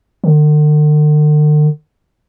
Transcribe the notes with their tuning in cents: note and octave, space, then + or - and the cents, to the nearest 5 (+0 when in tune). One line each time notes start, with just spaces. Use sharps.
D3 +45